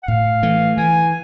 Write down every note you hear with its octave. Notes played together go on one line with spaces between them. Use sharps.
F#5
A2 F5
E3 A3
E3 G#5